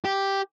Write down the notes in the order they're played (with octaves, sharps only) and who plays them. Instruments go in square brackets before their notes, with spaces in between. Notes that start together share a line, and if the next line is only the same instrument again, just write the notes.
[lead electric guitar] G4